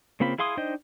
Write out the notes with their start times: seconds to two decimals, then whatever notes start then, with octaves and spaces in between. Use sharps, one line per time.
0.20 C#3 A#3 C4 F4 B5
0.38 E4 G#4 F5 C6 D#6
0.57 D4 D#4 C5 D#5 G5